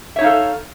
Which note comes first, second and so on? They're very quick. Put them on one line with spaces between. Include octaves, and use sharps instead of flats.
E5 C#5 D#4 F5 A4